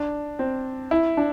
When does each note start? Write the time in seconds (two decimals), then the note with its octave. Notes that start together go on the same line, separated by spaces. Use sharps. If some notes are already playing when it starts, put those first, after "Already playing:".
Already playing: D4
0.39 C4
0.91 E4
1.17 D4